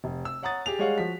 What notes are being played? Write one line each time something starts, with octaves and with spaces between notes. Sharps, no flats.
F1
E6
C#5 F#5 A#5 D#6 A6
G4 G#4 F7
G3 G#3 G#4 C#5 F5 F#5
F3 F#4 B6